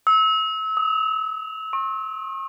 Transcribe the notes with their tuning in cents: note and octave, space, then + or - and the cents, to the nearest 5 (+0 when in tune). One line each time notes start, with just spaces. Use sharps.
E6 -30
D#6 +15
C#6 -45